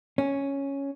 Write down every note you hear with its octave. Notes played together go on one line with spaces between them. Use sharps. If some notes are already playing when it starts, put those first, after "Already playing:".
C#4